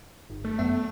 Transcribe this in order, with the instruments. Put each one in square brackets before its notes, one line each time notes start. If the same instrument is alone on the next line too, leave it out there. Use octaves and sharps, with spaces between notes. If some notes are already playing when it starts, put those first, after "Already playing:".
[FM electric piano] G1
[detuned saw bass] A3
[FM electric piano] F#2 B3 E5